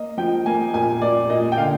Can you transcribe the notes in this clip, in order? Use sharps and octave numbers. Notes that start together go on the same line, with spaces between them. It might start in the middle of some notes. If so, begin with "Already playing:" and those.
Already playing: A#3 D#5
F3 G5
A#3 G#5
A#2 G#5
A#2 D5
A#2 D#5
G5
D3 F5